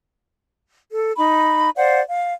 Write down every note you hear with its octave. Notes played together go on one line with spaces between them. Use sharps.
A4
D#4 B5
C5 D5 F5 F#5
F5